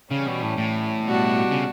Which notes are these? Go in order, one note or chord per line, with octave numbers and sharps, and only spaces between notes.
C#3 E3 G3 C#4
B2
A2
A2
B2 G3 D4 F#4
C#3